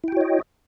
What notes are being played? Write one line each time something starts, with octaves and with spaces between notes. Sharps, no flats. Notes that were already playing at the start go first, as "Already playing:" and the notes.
E4 F#4 C#5 D#5 G5